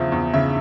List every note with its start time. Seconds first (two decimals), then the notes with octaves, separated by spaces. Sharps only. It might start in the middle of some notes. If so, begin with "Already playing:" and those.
Already playing: E2 C#3 F3 E5
0.12 E2
0.34 C#3 E5